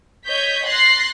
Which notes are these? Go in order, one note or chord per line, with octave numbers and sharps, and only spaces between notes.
C#5 D#5 G6 B6
C6 F#6 A6 A#6 C7